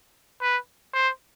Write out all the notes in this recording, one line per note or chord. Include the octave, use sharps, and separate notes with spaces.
B4
C5